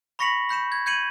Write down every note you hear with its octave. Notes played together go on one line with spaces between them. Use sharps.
B5 C#6 A#6 B6 C#7 F#7
B5 G6 C#7 E7
G#6
G6 G#6 C#7 D#7 F#7